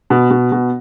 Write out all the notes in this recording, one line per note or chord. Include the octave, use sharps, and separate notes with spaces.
B2
B2
B2